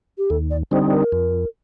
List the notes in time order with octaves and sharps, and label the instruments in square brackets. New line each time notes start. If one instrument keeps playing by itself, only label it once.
[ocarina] G4
[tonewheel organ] D#2 [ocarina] A4
[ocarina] D5
[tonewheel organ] D3 G3 C4 D#4 [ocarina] C5
[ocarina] A#4
[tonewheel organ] F2